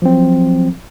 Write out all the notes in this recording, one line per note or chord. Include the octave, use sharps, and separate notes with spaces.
F3 F#3 C4